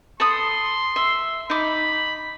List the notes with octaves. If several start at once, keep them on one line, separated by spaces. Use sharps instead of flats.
A4 B5 C6 D#6
E5
D#4 B5 D6